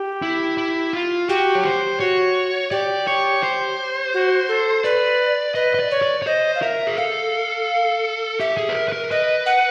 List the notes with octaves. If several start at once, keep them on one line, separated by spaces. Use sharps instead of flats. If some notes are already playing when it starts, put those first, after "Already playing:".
Already playing: G4
E4
E4
F4
F#4 G4
C#5
C5
F#4 C#5
G4 D5
C#5
C5
F#4
A4
B4 D5
B4 D#5
D#5
D5
C#5
D5
C#5
C5 D#5
F5
A#4 E5
G#4
A4 F5
G4 E5
G#4
B4
A#4
B4
A#4
B4 D#5
F#5